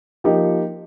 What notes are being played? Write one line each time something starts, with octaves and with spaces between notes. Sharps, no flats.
F3 A#3 D#4 G4